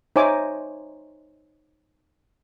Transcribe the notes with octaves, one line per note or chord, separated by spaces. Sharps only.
D#4 C5 C#5 E5 G#5 D6